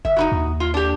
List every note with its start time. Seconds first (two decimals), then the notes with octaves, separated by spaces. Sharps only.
0.05 F#1 E5
0.17 D#4 E4 F#4
0.32 D#2
0.60 F4
0.74 D4 G4